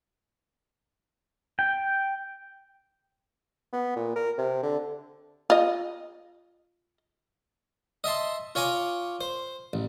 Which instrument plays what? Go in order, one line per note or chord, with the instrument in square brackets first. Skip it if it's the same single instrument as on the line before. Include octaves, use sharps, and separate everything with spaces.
[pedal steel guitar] G5
[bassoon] B3
A#2
A#4
C3
D3
[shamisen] F4 D#5
[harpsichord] D#5 E5 A5 C6
F4 C#5 G#5 A#5 D6
C5
A1